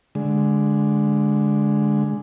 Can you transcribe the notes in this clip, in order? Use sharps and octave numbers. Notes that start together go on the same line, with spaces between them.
D3 G#3